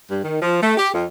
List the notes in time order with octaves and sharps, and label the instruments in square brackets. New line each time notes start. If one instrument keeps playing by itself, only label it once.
[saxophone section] G2
D#3
F3
A3
G4
F2